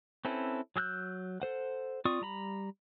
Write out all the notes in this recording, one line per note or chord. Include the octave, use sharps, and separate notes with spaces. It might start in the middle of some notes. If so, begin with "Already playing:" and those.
C4 C#4 E4 A4 B4
F#3 G#4 E6 F#6 G6
A4 C5 F#5
C4 F4 D5 C#6 D#6
G3 A#5 B5